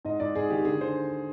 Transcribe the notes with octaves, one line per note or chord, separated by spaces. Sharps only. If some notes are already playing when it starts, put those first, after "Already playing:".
G#2 D#5
G#2 D5
G#2 G#4
D#3 G4
D3 G#4
D3 C5